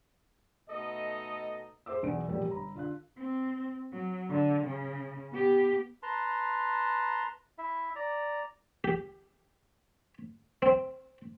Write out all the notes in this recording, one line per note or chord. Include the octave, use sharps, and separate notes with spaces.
B2 A3 D#4 A4 D#5
G#4 C5 E5 D6 E6
B1 E2 D5 D7
F1 E2 A#2 G3 A#3 C#5
G1 A#5 B5
D3 F4 F5 F#6
C4
F#3
D3
C#3
B3 G4
B4 A5 A#5 C6
E4 E5
D5 A#5
G4
C4